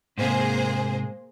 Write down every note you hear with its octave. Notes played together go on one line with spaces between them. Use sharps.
G#2 C3 A#3 G#4 C5